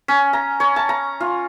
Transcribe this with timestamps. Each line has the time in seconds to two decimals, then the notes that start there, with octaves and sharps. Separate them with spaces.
0.08 C#4
0.33 A#5
0.60 C#5
0.76 A5
0.89 A#5
1.20 F4